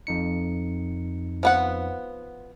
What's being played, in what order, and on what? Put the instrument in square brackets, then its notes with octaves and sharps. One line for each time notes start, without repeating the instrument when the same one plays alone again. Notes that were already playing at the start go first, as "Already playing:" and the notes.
[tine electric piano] F2 D#4 C#7
[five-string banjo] F3 B3 F#5